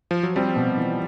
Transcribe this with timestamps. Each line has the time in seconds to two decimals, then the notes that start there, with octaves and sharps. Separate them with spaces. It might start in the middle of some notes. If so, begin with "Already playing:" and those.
0.11 F3
0.23 F#3
0.36 F3 G3 C4
0.56 B2
0.77 E3